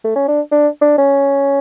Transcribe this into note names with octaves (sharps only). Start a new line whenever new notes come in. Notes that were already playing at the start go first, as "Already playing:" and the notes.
A3
C#4
D4
D4
D4
C#4